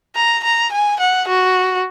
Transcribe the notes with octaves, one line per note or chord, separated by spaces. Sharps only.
A#5
A#5
G#5
F#5
F#4